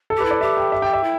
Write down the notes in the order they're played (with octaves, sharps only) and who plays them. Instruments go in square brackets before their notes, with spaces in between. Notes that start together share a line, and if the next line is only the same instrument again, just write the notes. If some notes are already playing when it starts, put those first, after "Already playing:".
[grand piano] A4
[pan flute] G4 [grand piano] B4
[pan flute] E4
[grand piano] D5
[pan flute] G4 [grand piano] E5
[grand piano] G5
E5
G5
E5
[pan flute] E4